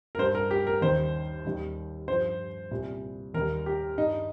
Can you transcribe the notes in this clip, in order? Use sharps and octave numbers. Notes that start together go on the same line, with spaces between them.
A#4
G2 G3 C5
A#4
G4
A#4
D#2 D#3 G3 C5
D#2 D#3 G3
G2 F3 C5
C2 A#2 G3
D#2 D#3 G3 A#4
G4
G2 G3 D#4